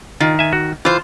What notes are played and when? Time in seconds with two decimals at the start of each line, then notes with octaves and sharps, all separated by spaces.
0.20 D#3 F4
0.39 E5 G#5
0.53 F#4
0.85 E3 F4 C5